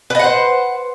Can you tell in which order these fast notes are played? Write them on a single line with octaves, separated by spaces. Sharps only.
B4 D#5 F#5 C5